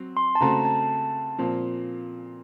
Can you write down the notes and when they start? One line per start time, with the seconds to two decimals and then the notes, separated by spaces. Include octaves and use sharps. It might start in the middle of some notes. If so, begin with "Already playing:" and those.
Already playing: F#3 C4
0.17 C6
0.35 A5
0.41 C#3 A3 C4 F#4 A#5
0.65 A5
1.38 A#2 F3 C4